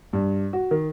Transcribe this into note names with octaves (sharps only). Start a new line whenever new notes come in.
G2
F#4
D#3